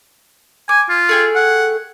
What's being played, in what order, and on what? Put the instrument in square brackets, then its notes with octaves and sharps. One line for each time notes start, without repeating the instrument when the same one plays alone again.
[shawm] G#5 [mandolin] D6
[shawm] F4
[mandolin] A3 G#4 G5
[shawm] F#5